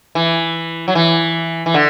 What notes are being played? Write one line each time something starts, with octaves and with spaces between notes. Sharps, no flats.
E3
F#3
E3
E3
D3